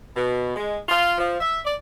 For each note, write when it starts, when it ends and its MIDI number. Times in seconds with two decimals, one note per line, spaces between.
0.16 0.53 47
0.55 0.77 56
0.88 1.12 65
1.17 1.36 53
1.40 1.60 76
1.64 1.74 74